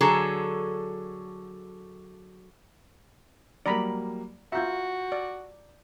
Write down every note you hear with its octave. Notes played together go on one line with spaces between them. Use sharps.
D3 F#3 G#4 A4
F#3 G3 A#3 D5 A#5 B5
F4 F#4 E5 A#5 G6
D5